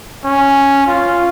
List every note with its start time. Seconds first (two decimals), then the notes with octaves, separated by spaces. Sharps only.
0.24 C#4
0.87 F4